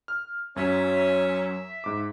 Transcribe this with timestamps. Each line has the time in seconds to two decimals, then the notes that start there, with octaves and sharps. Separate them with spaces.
0.08 F6
0.56 F#2 F#3 C#4 E5
1.84 G#2 D6